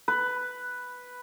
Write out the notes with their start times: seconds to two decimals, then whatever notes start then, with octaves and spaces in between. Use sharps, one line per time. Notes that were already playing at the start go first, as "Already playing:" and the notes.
0.08 B4